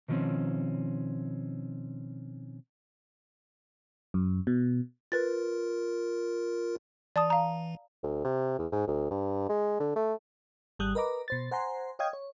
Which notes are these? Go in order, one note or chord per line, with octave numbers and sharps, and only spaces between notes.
B2 D#3 F3 A#3 C4 C#4
F#2
B2
F4 A#4 B4 A6
E3 D5 A5 D#6
F5 A#5
D2
C3
E2
G#2
D2
G2
G#3
D3
A3
G#1 G3 D#6 F#6
A#4 B4 D#5 A#5 D6
B2 C5 A6
C5 F#5 G#5 A#5 C6
C#5 D#5 F5 G5 D#6 G#6
C#5